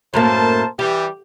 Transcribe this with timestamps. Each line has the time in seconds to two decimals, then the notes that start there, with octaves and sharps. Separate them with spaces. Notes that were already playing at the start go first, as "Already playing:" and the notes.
0.14 F#2 A2 A#3 A#4 C5 A5
0.79 E3 G3 G4